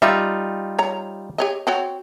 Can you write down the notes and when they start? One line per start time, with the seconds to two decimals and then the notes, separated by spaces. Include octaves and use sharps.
0.02 G3 D#4 F4 E5
0.79 C#5 A#5
1.38 G4 C#5 D#5
1.67 C4 F#4 C#5